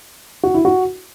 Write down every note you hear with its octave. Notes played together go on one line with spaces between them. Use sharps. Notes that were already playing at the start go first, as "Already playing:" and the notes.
F#4
E4
F#4